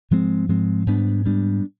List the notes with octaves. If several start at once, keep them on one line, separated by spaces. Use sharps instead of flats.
G#2 F3 G#3 C4
G#2 F3 G#3 C4
G#2 G3 B3 D4
G#2 G3 B3 D4